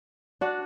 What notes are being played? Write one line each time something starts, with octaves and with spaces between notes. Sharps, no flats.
D4 F#4